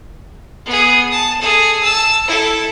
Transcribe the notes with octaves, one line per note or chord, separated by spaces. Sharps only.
B3 G#4
A5
G#4 A4
A5 E6
E4 A4